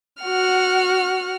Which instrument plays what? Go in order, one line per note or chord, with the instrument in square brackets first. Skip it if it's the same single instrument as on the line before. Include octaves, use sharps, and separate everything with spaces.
[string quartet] F#4 F#5 F6